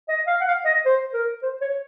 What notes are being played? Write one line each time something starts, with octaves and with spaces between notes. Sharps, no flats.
D#5
F5
F#5
F5
D#5
C5
A#4
C5
C#5